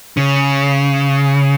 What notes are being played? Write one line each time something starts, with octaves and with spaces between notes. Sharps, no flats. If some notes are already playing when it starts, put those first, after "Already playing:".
C#3